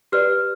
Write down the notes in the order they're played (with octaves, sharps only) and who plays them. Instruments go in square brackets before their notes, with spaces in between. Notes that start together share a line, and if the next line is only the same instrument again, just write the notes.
[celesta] G4 B4 D5 F6